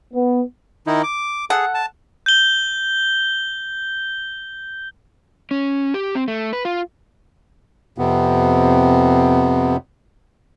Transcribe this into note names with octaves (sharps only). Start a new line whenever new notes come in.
B3
D#3 D#4 E4
D6
G#4 A4 F#5
A5
G6 G7
C#4
G4
C4
A3
B4
F4
F2 C3 B3